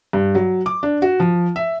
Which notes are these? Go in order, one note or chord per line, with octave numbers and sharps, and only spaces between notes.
G2
F#3
D6
D4
F#4
F3
E5